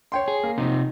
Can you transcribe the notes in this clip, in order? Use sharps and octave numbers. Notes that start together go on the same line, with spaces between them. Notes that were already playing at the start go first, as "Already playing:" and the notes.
C#5 G5 C6
G#4
A#3
C3 F3 D#4